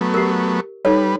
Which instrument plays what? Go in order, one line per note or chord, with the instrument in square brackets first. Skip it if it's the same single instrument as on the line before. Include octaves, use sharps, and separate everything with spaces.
[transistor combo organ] F#3 A3 B3
[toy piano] G4 A#4
[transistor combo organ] G3 B4 [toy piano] D#4 A4 C#5